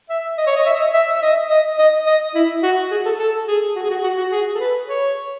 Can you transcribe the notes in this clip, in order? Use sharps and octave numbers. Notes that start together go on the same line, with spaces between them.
E5
D#5
C#5
D#5
E5
D#5
E5
E5
D#5
D#5
D#5
D#5
E4
F#4
G#4
A4
A4
G#4
F#4
G#4
F#4
F#4
F#4
G#4
A4
B4
C#5